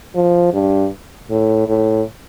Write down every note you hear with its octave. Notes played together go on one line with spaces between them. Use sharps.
F3
G2
A2
A2